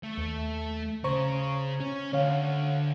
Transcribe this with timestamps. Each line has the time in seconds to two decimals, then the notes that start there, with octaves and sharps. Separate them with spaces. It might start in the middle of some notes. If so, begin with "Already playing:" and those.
0.03 A3
0.18 D#2
1.04 C#3 C5 A#5 C#6
1.80 C#4
2.13 D2 C#5 F5